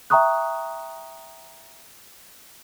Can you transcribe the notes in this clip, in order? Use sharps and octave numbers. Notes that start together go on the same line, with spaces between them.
E5 G5 A#5 C#6 D#6 F#6